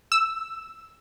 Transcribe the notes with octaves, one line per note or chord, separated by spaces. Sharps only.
E6